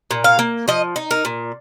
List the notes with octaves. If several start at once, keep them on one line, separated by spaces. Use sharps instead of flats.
A#2
F5
A#3
F3 D#5
D#4
A#4
A#2